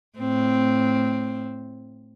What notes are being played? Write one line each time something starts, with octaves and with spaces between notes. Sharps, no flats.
A2 C4